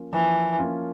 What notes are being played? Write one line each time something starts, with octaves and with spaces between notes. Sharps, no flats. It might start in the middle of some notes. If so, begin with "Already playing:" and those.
Already playing: F3 A#3 C#4 F4
E3 F3
A#3 C#4 F4